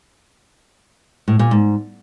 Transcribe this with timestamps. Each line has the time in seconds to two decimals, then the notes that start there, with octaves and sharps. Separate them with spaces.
1.28 A2
1.39 A#2
1.51 G#2